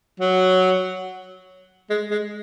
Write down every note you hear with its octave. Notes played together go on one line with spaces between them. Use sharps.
F#3
G#3
G#3